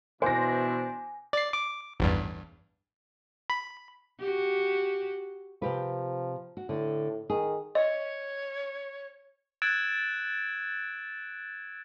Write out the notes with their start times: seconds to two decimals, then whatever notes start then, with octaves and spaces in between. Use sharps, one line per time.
0.22 B2 E3 D4 E4 C5 G#5 A#6
1.33 D5 C7
1.53 D6
2.00 A1 E2 G2
3.50 B5
4.20 F#4 G4
5.62 C3 F3 G4 B4
6.57 F#4
6.69 A2 D3
7.30 D#3 G#4
7.75 C#5 D#5
9.62 E6 F#6 G#6 A6 D7 E7